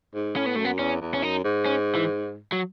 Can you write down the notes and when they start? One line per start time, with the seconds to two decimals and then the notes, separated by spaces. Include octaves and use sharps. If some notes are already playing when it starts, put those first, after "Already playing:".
0.15 G#2
0.35 A2 C#4
0.46 B3
0.56 F#2 A3
0.65 B3
0.79 E2 C#4
1.01 E2
1.14 C#4
1.22 F#2 D#4
1.44 G#2
1.66 C#4
1.95 E3
2.52 F#3